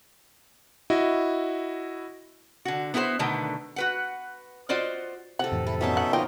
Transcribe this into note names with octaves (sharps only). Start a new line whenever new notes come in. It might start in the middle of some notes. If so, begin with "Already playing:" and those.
E4 F#4 D#5
D3 F#4
B3 E4 F#4 A#4 C5
B2 D3 D#3 A3 B3
F#4 B4 F#5
F4 F#4 C5 D5 D#5
C3 A4 F#5
F2 A2 E3
E4 A4
B2 C#4 D#4 A4 E5 A5
F#5
F3 A#3 D#4 F4 A#4 D#5 G5